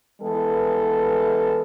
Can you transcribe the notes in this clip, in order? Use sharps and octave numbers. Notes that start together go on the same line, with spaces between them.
E3 G#3 B3 E4 A4